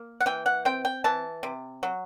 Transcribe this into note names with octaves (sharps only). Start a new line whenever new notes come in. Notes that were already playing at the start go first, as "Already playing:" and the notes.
Already playing: A#3
F#5
E3 G5
F#5
C4 G5
G5
E3 A5
C3
F#3